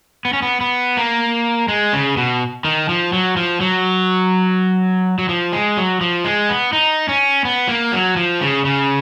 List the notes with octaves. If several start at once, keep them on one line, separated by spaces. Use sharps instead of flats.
B3
C#4
B3
B3
A#3
G#3
C#3
B2
D#3
F3
F#3
F3
F#3
F#3
F3
G#3
F#3
F3
G#3
B3
D#4
C#4
B3
A#3
F#3
F3
C#3
C#3